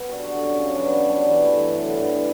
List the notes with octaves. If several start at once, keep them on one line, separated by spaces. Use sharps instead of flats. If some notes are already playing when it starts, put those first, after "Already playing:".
Already playing: B3
G3 D4 F#4
D3
F#3 C#4
C#3
F#3 B3 D4
C#3
G3 D4 F#4
E3
A3 E4
G2
D3 F#3
G2
E3 G3